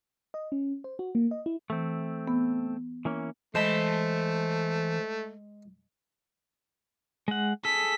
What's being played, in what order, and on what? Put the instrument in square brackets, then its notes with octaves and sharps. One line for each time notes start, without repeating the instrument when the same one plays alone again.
[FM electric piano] D#5
C#4
C5
F#4
A#3
D#5
E4
[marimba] E3 [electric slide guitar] A3 C4
[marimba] B3
[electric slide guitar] E3 A#3 C#4
[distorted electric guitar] E3 B5 [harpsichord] G#3 [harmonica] A3 [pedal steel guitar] C5 A5
[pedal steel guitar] G#3 F#5
[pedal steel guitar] G#4 A4 [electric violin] B6